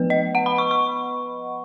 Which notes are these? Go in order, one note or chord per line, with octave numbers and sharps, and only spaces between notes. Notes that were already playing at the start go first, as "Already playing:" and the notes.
Already playing: F3 B3 B4
D#5
F#5
B5
C#6
C#6